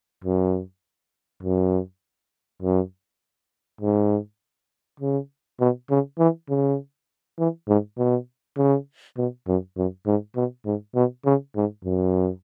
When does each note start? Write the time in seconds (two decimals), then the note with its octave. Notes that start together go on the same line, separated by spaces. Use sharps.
0.24 F#2
1.43 F#2
2.62 F#2
3.81 G#2
5.00 C#3
5.60 B2
5.90 C#3
6.19 E3
6.49 C#3
7.38 E3
7.68 G#2
7.98 B2
8.57 C#3
9.17 B2
9.47 F#2
9.77 F#2
10.07 G#2
10.35 B2
10.65 G#2
10.95 B2
11.25 C#3
11.56 G#2
11.85 F#2